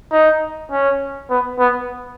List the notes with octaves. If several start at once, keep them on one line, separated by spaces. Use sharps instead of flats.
D#4
C#4
B3
B3